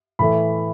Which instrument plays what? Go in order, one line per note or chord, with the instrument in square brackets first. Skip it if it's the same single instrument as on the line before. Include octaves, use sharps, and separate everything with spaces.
[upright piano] A2 E3 A3 B5